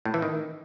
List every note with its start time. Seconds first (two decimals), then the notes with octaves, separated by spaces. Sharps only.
0.05 A2
0.14 E3
0.22 D#3